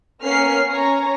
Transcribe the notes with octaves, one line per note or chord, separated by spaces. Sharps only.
A#3 B3 C#4 F6 C7
C#4 C#5 A#5